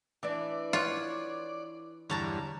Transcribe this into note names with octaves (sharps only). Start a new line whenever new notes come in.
E3 D4 D5
F4 C#5 F#5
E2 G2 D3 C#5 A5 A#5